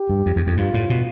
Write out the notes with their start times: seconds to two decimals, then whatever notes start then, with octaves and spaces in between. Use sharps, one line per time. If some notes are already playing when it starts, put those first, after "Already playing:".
Already playing: G4
0.10 G2
0.26 F2
0.36 E2
0.47 F2
0.57 G2 F4
0.74 A2
0.90 B2